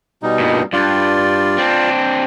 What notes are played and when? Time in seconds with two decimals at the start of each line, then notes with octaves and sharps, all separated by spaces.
0.23 B2 G3 D#4
0.40 G2 A#2
0.73 G2 F4 D5
1.58 C4 D4